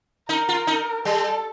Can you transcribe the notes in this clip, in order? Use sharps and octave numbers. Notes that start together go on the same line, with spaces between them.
D#4 A#4
F4
D#4
G3 A4